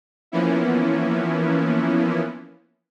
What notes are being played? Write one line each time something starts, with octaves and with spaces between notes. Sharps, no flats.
E3 F3 A#3 B3 C#4 E4